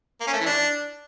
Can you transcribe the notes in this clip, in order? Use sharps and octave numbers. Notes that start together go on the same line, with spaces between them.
A#3
C#4
A3
E3
D4